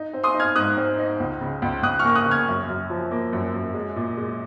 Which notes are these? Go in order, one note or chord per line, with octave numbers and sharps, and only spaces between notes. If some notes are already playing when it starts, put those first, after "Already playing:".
Already playing: D#4
C4
C6 D#6
D#4
F6 G#6
G#2 D#6 F#6
C4
D#4
C#2
C#3
C#2
C#2 D#6 F#6
C#6 F6
A#3
D#6 F#6
C#3
F6 G#6
F#2
F#2
F3
A#3
F#2
F#2
G#3
A#2
G#3